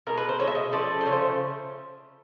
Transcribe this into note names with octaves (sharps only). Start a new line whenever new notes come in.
B2 G#3 A#4
B4
C5
B2 G#3 C#5
E5
D#5
C#3 F3 A3 D5
C5
C#3 F3 A3 C#5
C5